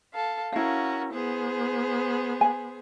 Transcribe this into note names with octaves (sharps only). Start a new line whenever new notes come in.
A4 F5
C#4 E4 F#4 A#4 F5
B3 G#4 C5
G#5